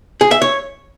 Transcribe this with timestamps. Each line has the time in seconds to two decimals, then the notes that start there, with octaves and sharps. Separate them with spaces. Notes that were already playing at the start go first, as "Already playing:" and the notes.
0.21 G#4
0.31 E5
0.42 C#5